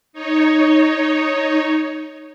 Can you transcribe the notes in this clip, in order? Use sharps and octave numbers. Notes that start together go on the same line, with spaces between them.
D#4 C#5